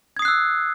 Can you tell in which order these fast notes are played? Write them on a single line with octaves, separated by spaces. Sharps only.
G#6 D#6 C7 F#6 E6